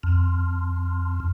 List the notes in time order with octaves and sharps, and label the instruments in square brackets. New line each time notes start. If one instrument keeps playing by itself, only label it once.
[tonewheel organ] F2